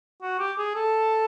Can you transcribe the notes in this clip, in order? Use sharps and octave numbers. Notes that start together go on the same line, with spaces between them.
F#4
G4
G#4
A4